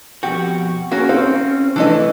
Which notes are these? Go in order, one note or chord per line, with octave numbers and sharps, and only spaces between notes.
F2 B2 F#4 G4
A#3 C#4 F#4 G#4 A#4
C4 C#4 F5
C3 E3 A3 D4 A4 B4 D#5